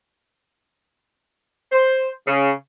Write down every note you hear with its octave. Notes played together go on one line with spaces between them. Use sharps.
C5
C#3